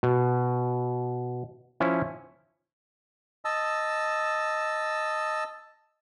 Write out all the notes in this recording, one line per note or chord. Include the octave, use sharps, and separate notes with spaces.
B2
F3 C#4 E4
D#5 A5 E6